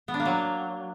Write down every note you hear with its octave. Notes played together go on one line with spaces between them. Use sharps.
B3
D4
A#3
F#3